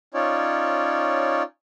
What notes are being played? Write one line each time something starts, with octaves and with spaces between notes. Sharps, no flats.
C#4 D#4 F4 C#5 D5